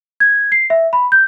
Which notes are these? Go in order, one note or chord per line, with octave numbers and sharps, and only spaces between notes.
G#6
C7
E5
B5
G6